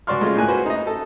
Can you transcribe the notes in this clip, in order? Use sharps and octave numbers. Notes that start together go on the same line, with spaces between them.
C#2 F#4 D5 C6 C#6 F6
G#3 A3 C#4 F4
A2 A#3 G#5 F#6
F#4 B4 C5
D#4 D#5
A4